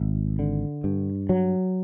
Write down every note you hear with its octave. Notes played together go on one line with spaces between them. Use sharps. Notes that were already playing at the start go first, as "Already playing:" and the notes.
Already playing: G#1
D3
G2
F#3